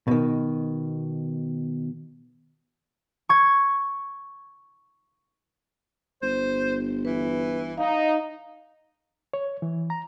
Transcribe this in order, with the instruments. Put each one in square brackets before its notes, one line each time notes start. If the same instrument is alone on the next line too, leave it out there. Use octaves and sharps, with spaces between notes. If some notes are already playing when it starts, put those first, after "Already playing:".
[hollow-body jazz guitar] B2 D#3
[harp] C#6 G#6
[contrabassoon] G1 [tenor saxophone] C5
[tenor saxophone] E3 [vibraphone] B4
[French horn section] D#4 [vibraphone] F5
[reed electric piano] C#5
E3
A#5